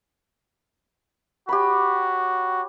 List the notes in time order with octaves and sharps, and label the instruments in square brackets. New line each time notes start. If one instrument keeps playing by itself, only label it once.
[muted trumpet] F#4 [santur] G4 C#5 B5